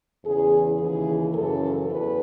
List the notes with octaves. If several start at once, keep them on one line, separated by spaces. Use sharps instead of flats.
E2 C#3 E3 G#4
D#2 C#3 E3 G#4
F#2 C#3 E3 A4
E2 B4